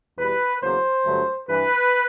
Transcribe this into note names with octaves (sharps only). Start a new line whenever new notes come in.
E2 B2 G3 B4
E2 C#3 F#3 A#3 C5
G2 D3 F#3 A3
G2 E3 G3 B4